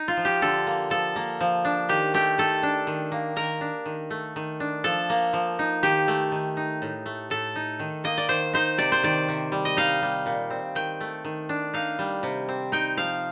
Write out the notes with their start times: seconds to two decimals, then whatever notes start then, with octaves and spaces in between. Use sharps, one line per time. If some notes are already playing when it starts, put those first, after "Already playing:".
Already playing: D#4
0.08 F4
0.17 F3
0.25 G4
0.42 D3 A4
0.67 A#3
0.90 F3 A4
1.16 A#3
1.41 F3
1.65 D4
1.89 D#3 G4
2.14 A3 G4
2.38 D#3 A4
2.63 D4
2.87 D#3
3.12 A#3
3.36 D#3 A#4
3.61 D4
3.86 D#3
4.10 A3
4.36 D#3
4.60 D4
4.84 F3 A4
5.10 A#3
5.33 F3
5.59 D#4
5.83 D#3 G4
6.08 A3
6.32 D#3
6.57 D#4
6.82 A2
7.06 A3
7.30 A2 A4
7.56 D#4
7.80 D#3
8.04 A#3 D#5
8.18 D5
8.29 D#3 C5
8.53 D#4 C5
8.78 C3 D5
8.92 C5
9.03 D#3 D5
9.28 C3
9.52 G3
9.65 D#5
9.77 D#4 F5
10.02 G3
10.26 A#2
10.50 C4
10.75 D#3 G5
11.00 A3
11.25 D#3
11.49 D4
11.74 D#4 F5
11.99 G3
12.23 C3
12.49 C4
12.72 D#4 G5
12.97 F3 F5